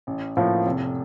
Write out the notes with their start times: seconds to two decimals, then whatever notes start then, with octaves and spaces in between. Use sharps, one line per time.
0.07 A1
0.37 A2 F3 A#3 F4
0.66 F1